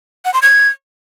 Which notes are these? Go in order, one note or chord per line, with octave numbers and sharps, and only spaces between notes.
F#5
C6
G#6